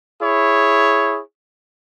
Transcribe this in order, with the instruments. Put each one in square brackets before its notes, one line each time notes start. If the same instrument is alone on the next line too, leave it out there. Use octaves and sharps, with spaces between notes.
[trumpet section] E4 G#4 C#5